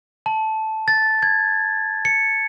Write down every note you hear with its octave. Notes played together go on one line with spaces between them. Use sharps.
A5
A6
G#6
C#7